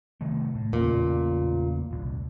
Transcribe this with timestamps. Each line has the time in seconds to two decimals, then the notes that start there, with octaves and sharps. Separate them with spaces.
0.21 C3 D#3 A3
0.55 A2
0.73 E2 A#2 C#3
1.91 D#1 C2